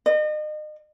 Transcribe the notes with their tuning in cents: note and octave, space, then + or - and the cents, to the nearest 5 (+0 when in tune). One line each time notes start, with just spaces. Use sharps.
D#5 -35